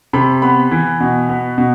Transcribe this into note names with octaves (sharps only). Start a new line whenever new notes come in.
C3 B5
B3 B5
E3
B2
B3
B2